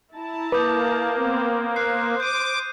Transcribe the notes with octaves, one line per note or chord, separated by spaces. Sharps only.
E4 A5 A#5
A#3 B4 D6 D#6 G6
B3 C4
C5 F#6 C7
D6 G6 D#7